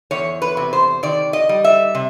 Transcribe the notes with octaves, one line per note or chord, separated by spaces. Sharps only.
E2 C#5
B4
C3
C5
D#3 D5
D#5
G3
E5
C3